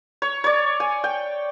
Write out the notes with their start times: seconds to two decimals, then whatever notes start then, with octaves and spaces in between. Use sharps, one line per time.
0.22 C#5
0.44 C#5 D5
0.80 G#5
1.04 G5